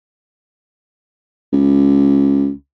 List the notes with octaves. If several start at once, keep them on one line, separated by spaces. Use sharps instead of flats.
C#2